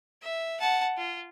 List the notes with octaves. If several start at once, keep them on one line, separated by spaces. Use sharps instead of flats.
E5
F#5 A5
F4